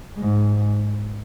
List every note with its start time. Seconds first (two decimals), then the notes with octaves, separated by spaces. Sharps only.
0.18 G#2